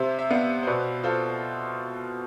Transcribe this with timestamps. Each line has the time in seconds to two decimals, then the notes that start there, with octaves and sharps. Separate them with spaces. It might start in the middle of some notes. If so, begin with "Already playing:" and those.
Already playing: C3 C5 E5
0.19 E5
0.30 B3 D5 F5
0.63 C5
0.67 B2 B4 D5
1.04 F4 A4 C5